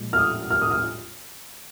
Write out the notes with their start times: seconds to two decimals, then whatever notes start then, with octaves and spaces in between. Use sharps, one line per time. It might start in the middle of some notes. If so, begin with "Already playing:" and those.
Already playing: A#2 F3 G#3
0.13 F6
0.18 D#6
0.50 F6
0.61 D#6
0.71 F6